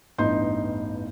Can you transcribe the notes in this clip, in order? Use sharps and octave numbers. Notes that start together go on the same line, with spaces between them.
A1 E2 G2 D#4 C6 G6